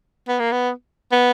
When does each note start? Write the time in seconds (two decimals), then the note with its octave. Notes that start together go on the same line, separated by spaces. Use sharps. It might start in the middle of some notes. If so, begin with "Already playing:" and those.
0.28 B3
0.39 A#3
0.52 B3
1.12 B3